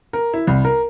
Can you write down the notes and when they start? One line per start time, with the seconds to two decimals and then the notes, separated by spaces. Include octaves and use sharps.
0.13 A#4
0.34 E4
0.47 C2
0.65 A#4